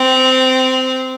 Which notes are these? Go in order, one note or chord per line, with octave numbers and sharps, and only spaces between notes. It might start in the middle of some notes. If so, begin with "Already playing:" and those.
Already playing: C4